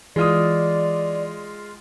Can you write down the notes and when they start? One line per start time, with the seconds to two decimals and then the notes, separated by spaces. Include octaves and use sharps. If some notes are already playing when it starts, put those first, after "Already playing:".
0.16 E3 G#3 F4 D5 D#6